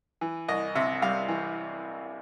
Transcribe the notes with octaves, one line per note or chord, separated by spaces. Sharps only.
E3
C2 D#5
C3 E5
G3 F5
E3